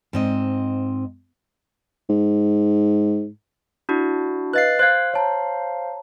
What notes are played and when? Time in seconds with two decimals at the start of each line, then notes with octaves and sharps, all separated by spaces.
0.13 G#2 C4 D#5
2.10 G#2
3.89 D4 E4 F#4
4.53 B4 D#5 F5 F#6 A6 C7
4.79 C5 F5 F#6 G#6
5.14 C#5 A5 A#5